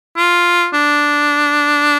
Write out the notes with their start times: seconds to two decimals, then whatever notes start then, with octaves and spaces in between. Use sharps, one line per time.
0.17 F4
0.73 D4